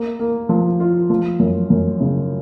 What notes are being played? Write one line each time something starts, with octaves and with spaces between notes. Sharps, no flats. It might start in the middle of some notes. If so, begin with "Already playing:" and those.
Already playing: A#3
A#3
F3
F4
F3
F#2
F#2
C#3